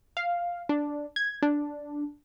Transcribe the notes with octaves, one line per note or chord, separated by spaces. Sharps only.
F5
D4
G#6
D4